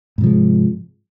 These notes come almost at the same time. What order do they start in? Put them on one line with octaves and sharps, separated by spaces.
G#2 C3 F3 G#3